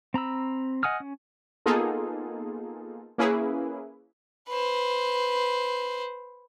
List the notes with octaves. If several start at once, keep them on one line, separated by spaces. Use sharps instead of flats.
C4 A#5 B5 E6
D#5 F#5 G#5 D#6 F6
C#4
A#3 B3 D#4 F4 G#4 A4
A#3 C#4 E4 G#4 B4
B4 C5